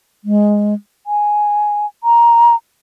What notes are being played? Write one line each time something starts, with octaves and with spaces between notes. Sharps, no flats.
G#3
G#5
A#5